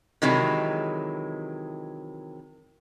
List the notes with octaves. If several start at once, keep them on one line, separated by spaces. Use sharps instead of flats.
C3 D#3 E3 F#3 G#3